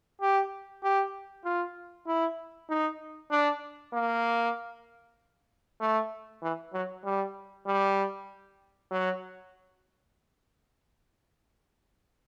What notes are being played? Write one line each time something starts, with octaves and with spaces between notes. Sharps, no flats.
G4
G4
F4
E4
D#4
D4
A#3
A3
E3
F#3
G3
G3
F#3